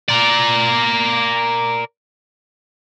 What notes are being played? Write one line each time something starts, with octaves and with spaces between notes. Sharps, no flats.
A#4 D5